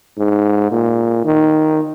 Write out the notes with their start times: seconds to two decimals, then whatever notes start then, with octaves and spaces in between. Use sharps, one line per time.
0.18 G#2
0.72 A#2
1.25 D#3